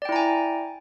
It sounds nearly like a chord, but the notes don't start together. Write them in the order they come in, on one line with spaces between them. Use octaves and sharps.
D5 G5 E4 A#5 G#5